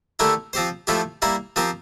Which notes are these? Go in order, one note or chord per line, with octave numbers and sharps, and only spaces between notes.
D3 A3 E4 G4 A#4
F3 C4 G4 C5
F3 A3 E4 G4
G3 A#3 E4 A#4
F3 C4 G4 A#4